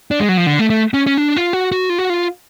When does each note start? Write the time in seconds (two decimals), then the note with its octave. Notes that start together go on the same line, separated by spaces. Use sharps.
0.11 D4
0.20 G#3
0.29 F#3
0.37 F3
0.47 D3
0.59 A3
0.70 A3
0.94 C#4
1.07 C#4
1.17 D4
1.36 F4
1.53 F#4
1.72 F#4
1.90 F4
1.99 F#4
2.10 F4